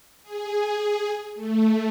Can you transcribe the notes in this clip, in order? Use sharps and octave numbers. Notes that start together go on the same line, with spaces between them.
G#4
A3